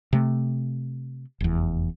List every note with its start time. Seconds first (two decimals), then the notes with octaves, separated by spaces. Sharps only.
0.13 C3 A3
1.41 F1 E2